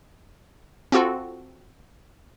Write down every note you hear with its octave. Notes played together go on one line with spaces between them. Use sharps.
C4 F4 F#4 A4